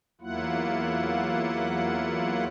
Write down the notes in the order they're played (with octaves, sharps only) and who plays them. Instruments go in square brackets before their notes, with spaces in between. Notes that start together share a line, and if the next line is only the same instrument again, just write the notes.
[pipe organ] E2 F#3 A#3 E4 F4 F#5